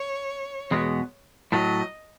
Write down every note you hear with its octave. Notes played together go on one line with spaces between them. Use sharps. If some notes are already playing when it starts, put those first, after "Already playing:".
Already playing: C#5
E2 B2 G#3 B3
A2 F#3 A3 D#5